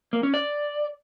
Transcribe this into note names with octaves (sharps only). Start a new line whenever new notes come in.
A#3
C#4
D5